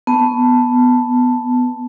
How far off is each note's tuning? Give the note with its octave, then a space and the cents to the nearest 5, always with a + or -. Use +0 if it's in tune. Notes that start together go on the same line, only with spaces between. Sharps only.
B3 +0 A5 +0